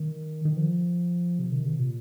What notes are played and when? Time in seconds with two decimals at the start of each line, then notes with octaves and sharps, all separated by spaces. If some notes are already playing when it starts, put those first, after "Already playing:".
Already playing: D#3
0.45 D#3
0.57 F3
1.39 C3
1.52 D#3
1.65 C3
1.79 A#2